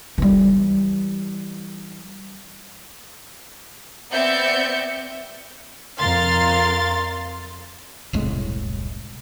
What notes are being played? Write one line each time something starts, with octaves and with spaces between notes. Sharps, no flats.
E3 G3
B3 C4 D5 E5 G6 C#7
F2 A#4 F5 C6 A6
E1 C2 A2 G#3